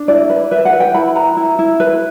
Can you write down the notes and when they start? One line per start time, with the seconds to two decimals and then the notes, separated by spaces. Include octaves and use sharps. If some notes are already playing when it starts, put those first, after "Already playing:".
Already playing: D4
0.08 E4 D5
0.30 B4
0.51 B4 E5
0.65 F#5
0.73 B4
0.80 G5
0.94 E4 B5
1.16 B4 A#5
1.37 E4
1.59 E4
1.80 B4